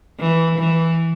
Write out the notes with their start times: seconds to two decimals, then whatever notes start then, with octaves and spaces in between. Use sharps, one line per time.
0.20 E3
0.60 E3